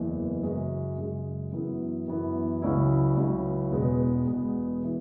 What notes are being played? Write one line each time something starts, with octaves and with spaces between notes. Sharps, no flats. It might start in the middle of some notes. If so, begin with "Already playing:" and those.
Already playing: F#1 E2 E3
F#2 C#3 G#3
F#2 C#3 G#3
F#2 E3 B3 E4
F#2 E3 B3 E4
C#2 C#3 F#3 E4
C#2 C#3 F#3 E4
E1 E2 B2 G#3 B3
E1 E2 B2 G#3 B3
E3